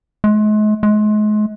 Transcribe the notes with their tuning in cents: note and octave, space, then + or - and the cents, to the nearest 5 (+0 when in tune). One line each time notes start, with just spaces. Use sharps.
G#3 +40
G#3 +35